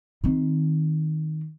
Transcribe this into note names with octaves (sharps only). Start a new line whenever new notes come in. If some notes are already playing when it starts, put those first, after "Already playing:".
D#3 C4